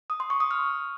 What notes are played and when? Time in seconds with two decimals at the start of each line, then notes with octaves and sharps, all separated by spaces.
0.10 D#6
0.20 C6
0.30 C#6
0.40 D#6
0.51 F6